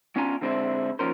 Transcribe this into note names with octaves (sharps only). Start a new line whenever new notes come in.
B3 C#4 D4 F4 G#5 A#5
D3 G#3 C4 D4 E4 C5
D#2 B2 F3 C#4 A#4 C5